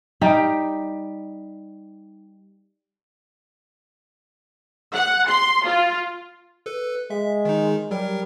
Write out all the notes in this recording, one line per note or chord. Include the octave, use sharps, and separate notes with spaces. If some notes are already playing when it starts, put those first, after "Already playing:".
G3 D#4 G4
F#5
C6
F4
A4 B4
G#3 E5
D#3 D#4
F#3 G3 A#4